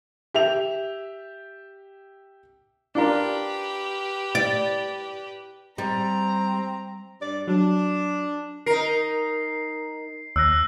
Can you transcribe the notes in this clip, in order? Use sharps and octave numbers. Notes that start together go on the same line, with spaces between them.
G4 E5 F7
D4 F4 G4 A#4 B4
D5
G3 C4 A#5
G2 D5
F#3 D4
D#4 A#4 C7
D#2 E6 F#6 A#6